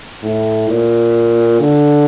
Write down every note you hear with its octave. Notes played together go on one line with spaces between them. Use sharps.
A2
A#2
D3